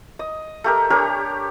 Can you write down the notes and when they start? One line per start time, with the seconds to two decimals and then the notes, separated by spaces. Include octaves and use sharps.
0.19 D#5
0.64 A3 G4 A#4
0.90 D4 G4 A#4 C#5